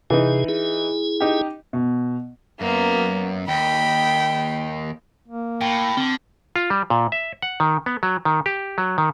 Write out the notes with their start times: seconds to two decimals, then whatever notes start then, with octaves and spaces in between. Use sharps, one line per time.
0.10 C3 E3 D#4 G#4
0.49 E4 G#4
1.20 D#4 G4
1.73 B2
2.61 F#2 A#3 B3
3.48 D#2 G5 B5
5.28 A#3
5.61 A2 G5
5.97 D3 C4
6.56 F4
6.70 G3
6.90 A#2
7.12 E5
7.42 F#5
7.60 D#3
7.86 B3
8.03 F#3
8.25 D#3
8.46 G4
8.78 F#3
8.98 D#3